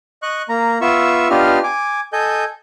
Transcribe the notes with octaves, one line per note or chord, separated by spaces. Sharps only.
D#5 C#6 F#6
A#3 A#5
B3 F4 E5 C#6 E6
B3 D4 F4 G4 D#5 F6
G#5 D6
A4 D#5 G#5 G6